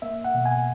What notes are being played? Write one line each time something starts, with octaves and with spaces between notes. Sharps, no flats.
A#3 E5
F#5
B2
G#5